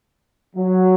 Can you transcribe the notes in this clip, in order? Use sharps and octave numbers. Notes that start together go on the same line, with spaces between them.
F#3